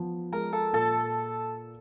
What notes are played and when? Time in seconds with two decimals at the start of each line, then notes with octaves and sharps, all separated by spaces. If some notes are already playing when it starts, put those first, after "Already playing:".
Already playing: F3 B3
0.32 G#3 A#4 A#5
0.53 A4 A5
0.73 A#2 A4 A5